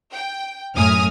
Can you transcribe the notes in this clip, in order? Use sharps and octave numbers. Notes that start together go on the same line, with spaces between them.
G5
F#2 A2 G#5 D#6 F6